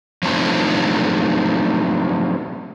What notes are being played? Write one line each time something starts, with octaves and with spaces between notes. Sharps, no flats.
F3 F#3 A3 C4 D4 D#4